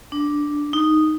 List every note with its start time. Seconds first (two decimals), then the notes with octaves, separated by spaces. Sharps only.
0.12 D4
0.73 D#4